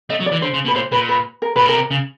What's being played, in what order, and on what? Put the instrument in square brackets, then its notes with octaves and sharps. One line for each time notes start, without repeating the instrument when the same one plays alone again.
[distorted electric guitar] A3 [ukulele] D#5
[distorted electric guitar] F#3
[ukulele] D5
[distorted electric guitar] E3
[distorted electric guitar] D3 [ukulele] C5
[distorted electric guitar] C#3
B2
[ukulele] B4
[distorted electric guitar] A#2 [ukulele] C5
[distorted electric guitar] A#2 [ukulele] B4
[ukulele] B4
A#4
[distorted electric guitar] A#2 [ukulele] B4
[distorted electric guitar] B2 [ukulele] A#4
[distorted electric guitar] C3
C#3